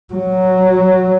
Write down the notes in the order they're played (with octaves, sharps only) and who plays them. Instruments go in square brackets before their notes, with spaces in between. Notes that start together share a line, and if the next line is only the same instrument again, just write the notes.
[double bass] F#3